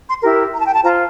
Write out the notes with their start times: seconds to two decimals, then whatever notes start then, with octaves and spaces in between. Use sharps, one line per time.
0.08 C6
0.22 E4 G4 A#4
0.53 A#5
0.60 A5
0.67 G5
0.74 A5
0.83 F4 C5 A#5